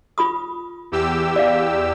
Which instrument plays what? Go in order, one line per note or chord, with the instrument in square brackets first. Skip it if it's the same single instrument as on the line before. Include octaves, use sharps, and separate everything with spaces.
[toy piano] F4 B5 D#6
[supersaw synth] E2 G4 E6
[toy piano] D5 F5